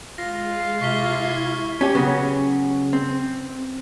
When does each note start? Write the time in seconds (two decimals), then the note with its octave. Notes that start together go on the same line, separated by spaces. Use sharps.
0.18 G#3 F4 A#6
0.81 C3 E4 C#6 G#6 B6 G7
1.81 C#4 G4
1.95 C#3 F#3 B3 C#4
2.93 C4